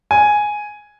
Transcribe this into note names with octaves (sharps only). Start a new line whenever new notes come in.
G#5